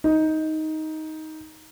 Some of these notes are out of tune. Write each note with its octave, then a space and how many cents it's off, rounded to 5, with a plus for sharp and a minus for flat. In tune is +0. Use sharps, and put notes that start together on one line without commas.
D#4 +10